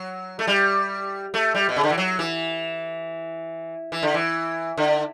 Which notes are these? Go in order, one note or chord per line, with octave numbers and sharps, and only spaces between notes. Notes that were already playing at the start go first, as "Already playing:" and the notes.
Already playing: F#3
A3
G3
A3
G3
B2
C#3
D3
E3
F#3
E3
E3
D3
E3
D3